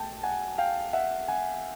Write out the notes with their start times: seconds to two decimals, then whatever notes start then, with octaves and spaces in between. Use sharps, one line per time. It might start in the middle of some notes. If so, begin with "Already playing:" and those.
Already playing: B1 A3 G5 A5
0.23 F#5 G#5
0.58 F5 G5
0.93 E5 F#5
1.28 F#5 G#5